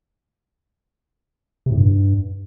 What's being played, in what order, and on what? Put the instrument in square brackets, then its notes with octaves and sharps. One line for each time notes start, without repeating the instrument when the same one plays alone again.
[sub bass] C3
A2
G2